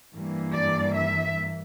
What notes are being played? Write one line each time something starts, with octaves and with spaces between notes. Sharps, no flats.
G2 E3 A#3
D5
E5